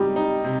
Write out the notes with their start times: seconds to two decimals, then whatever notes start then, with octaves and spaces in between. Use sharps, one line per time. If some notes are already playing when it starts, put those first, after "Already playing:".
Already playing: G3 D#4 G4
0.16 D#4
0.44 C3